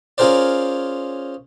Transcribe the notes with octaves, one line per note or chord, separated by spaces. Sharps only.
C#4 F4 G#4 A#4 C5 D5